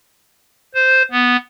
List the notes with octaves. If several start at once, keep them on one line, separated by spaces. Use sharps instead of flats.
C5
B3